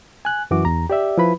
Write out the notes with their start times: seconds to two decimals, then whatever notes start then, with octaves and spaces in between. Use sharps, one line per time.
0.25 G#5 F#6
0.51 F#2 E3 F#4 D6
0.65 E2 A#5
0.90 G4 D5 E5
1.18 F3 E4 B4 B5